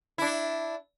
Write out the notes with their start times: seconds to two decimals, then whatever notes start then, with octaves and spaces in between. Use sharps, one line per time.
0.18 D4 E4